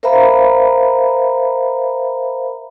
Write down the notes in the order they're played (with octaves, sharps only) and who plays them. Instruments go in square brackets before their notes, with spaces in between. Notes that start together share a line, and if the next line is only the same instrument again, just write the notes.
[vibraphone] A#4 C5 E5 F5 A#5 B5